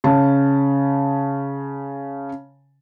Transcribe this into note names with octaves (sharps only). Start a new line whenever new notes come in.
C#3 C#4 A5